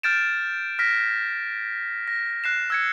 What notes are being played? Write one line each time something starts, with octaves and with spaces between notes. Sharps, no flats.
F6 G6 A6 D7 E7
F6 A#6 B6
A#6
F#6 C7 E7
E6 G#6 C#7